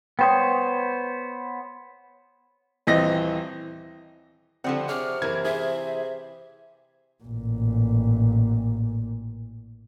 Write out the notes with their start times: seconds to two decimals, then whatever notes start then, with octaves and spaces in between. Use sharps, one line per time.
0.19 B3 C5 C#5 G5 D#6
2.87 D#1 E3 C4 D#5 A#6
4.64 D3 F3 G3 C4 F#5
4.89 C3 G#4 C#5 D5 F6
5.22 F#1 E3 A#4 G#6
5.45 G#4 C5 E5
7.24 A1 A#2